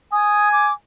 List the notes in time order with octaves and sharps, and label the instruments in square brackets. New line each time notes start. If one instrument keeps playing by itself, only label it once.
[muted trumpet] G#5 [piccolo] D#6
[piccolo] D6